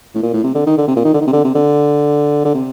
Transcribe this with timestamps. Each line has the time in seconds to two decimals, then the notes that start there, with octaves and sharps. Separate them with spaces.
0.15 A2
0.23 A#2
0.33 A2
0.44 C3
0.55 D3
0.67 D#3
0.78 D3
0.88 C3
0.96 A#2
1.05 D#3
1.14 D3
1.21 D#3
1.27 C3
1.33 D3
1.44 C3
1.55 D3
2.45 D3
2.55 C3